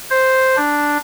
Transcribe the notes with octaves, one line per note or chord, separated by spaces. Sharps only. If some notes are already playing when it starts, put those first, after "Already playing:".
C5
D4